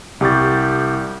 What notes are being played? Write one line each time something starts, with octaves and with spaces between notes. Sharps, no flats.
C2 G4 C#6 G6 A6